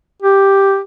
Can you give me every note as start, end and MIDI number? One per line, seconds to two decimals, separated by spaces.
0.22 0.80 67